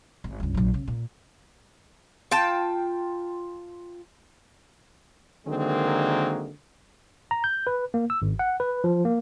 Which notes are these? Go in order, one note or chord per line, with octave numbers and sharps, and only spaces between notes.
G#1
C#2 G2
A#1 F#3
C#3
A#2
F4 G5 A5
D3 D#3 F#3 G#3 A#3 C4
A#5
G6
B4
A#3
E6
G#1
F#5
B4
F3
A#3